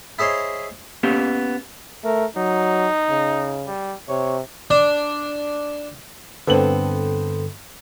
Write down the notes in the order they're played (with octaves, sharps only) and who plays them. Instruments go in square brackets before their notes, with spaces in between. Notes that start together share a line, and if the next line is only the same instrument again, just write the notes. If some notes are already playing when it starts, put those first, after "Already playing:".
[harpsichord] E4 G#4 C5 C#5 D#5
[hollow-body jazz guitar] A#3 B3 C#4 G4
[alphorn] A3 [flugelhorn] A#4
[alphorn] F#3 [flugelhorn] D#4
[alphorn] C#3
[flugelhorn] G3
[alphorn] C3 [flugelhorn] C#5
[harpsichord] D4
[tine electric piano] G2 D3 [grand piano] B3 C4 F#7 [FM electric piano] A4 [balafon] B4 C5